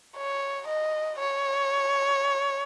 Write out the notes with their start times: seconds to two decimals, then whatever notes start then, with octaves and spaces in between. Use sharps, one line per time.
0.17 C#5
0.68 D#5
1.19 C#5